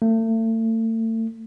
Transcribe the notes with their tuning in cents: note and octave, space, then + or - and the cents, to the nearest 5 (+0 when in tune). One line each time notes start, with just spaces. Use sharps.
A3 +35